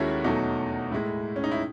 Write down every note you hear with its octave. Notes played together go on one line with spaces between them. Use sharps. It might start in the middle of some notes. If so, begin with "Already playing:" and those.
Already playing: D#2 D#3 G#3 C#4 E4 F#4 A4
E2 B2 F#3 A3 D#4
A2 G#3 E4
C#4
D#4
E4